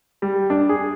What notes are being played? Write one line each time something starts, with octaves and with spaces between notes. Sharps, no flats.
G3
D4
G#4